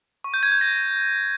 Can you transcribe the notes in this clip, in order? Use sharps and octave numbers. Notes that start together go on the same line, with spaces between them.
C#6
G6
G#6
G6
A#6